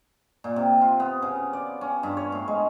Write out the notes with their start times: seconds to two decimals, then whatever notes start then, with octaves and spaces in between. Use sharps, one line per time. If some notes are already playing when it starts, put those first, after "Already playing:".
0.44 A#2
0.56 C3
0.81 F4
1.00 B3
1.22 C#3
1.53 D5
1.81 C#4
2.03 G2
2.17 C#5
2.32 A2
2.48 G#3